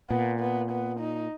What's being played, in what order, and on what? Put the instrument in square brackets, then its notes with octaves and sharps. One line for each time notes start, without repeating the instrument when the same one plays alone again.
[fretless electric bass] A#2 [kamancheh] B3
[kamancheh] B3
B3
D#4